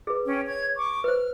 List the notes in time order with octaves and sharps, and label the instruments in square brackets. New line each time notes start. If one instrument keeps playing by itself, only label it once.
[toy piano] G#4 B4
[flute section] C#4 G5
C#5 G#6
C#6 D6
[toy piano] B4 C5 [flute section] F6